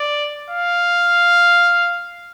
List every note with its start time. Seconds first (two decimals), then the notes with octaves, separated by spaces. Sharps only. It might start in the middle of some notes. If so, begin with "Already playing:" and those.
Already playing: D5
0.50 F5